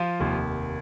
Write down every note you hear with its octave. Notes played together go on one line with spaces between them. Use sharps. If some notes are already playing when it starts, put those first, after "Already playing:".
Already playing: F3 F4
F1 D#2 D#3